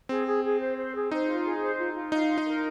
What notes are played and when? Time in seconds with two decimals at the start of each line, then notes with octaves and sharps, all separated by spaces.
0.09 C4 G#4
0.26 G#4
0.44 G#4
0.60 C5
0.77 C5
0.95 G#4
1.11 D#4 C5
1.27 F4
1.45 G#4
1.61 C5
1.78 F4
1.94 F4
2.11 D#4 F5
2.29 C6
2.38 D#4
2.46 A#4